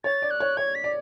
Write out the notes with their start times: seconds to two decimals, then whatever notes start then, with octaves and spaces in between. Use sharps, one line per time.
0.04 C#5 A6
0.22 D5
0.31 F#6
0.40 C#5
0.57 C#5 G#6
0.75 B6
0.84 D5